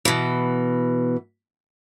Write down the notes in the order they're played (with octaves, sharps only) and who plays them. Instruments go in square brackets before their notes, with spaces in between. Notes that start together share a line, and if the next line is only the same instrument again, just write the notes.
[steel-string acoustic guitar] B2 E3